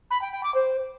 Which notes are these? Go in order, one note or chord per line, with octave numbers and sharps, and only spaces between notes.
B5
G5
G5
D6
C5